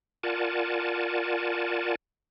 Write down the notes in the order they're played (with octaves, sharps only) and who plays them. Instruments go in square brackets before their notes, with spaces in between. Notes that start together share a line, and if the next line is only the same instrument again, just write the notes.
[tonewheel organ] F4 A#4 D5 F#5 G#5 A5